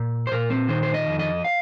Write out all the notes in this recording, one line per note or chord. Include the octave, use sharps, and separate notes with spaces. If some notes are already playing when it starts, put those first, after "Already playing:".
Already playing: A#2
C5
A#2 A#4
C4
D#3 C5
C5
D#5
F2
D#5
F5